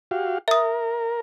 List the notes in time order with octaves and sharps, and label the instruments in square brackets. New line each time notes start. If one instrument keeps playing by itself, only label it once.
[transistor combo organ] F#4 G4 F5
[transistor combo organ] A#4 [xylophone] E5 D#6